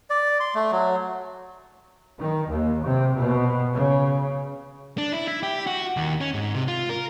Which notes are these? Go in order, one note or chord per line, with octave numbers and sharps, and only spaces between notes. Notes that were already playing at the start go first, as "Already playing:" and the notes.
D5
C6
A3
F#3
D#3
D#2
C3
B2
C#3
D4
E4
E4
G4
F#4
D#2
C#4
G#2
C3
F4
A#4